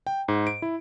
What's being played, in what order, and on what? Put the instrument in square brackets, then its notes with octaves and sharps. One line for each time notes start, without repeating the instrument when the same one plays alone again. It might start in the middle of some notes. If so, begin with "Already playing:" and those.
[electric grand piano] G5
G#2
D7
E4